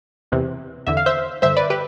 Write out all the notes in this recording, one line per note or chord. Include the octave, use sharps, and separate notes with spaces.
E2 C3 E3
E2 D3 E5
F5
C5 E5
G2 D3 C5 E5
B4 D5
G4 B4